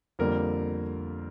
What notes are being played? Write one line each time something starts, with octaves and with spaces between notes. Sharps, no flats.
F2 D3 G3 A#3 A#4